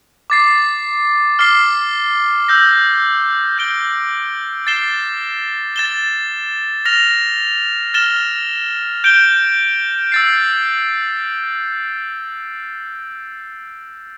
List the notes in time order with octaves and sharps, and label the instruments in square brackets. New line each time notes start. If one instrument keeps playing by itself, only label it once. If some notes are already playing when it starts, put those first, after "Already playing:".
[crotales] D6 A6 C7
D6 F6 C7 G7
E6 G6 A#6
G6 D7 G7
A6 C7 E7 G7
A6 E7 G7
F6 A#6 F7
F6 A6 E7 G7
G6 D7 G7
E6 A6 C7